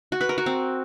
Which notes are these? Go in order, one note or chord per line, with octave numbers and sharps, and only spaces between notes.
F#4
B4
A#4
F#4
C4